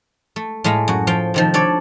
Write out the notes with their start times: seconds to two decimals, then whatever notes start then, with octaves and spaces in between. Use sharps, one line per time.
0.36 A3
0.64 A2 G#3 A3 F5
0.88 F#2 F#4
1.07 F3 F5 G5
1.34 C3 D#3 F3
1.54 D4 A4 C#5 D5